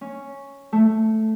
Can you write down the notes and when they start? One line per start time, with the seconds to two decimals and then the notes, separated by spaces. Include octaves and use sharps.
0.01 C#4
0.72 A3